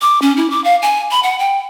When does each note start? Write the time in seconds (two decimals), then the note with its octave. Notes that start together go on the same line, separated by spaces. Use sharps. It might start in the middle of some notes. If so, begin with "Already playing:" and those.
0.02 D6
0.22 C#4
0.37 E4
0.50 D6
0.64 F5
0.82 G#5
1.11 B5
1.23 F#5
1.39 G5